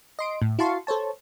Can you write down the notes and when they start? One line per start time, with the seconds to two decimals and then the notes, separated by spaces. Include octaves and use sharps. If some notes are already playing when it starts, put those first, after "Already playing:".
0.19 D#5 C6 D7
0.42 A2
0.59 E4 F#4 F5 A5 C6 C#6
0.87 A4 C5 C#5 A5